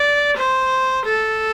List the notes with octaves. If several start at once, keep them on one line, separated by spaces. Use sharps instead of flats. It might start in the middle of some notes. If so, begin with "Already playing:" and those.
Already playing: D5
C5
A4